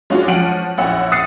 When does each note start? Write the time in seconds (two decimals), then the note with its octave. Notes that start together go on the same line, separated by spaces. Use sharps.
0.10 G#3 C#4 D4 F4 F#4
0.28 F3 C#4 F#5 D7 D#7 F#7
0.78 A#1 C#4 E4 F#5 E6
1.12 D#6 F#6 A6 C7 C#7 D#7